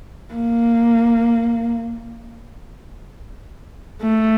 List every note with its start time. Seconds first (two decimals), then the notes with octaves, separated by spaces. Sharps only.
0.34 A#3
4.02 A3